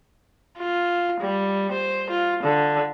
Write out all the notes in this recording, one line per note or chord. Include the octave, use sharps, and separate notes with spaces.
F4
G3
C5
F4
D3